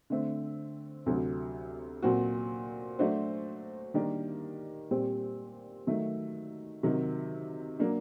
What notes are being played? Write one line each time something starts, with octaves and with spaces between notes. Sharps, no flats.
D3 A3 C4
D2 C3 F#3
A#2 F#3 C4 F#4
F#3 A3 D4 F#4 C5
D#3 G3 A#3 D4 G4
A#2 G3 C4 G4 C5
D#3 F#3 A3
C3 D#3 F#3
F#3 A#3 D4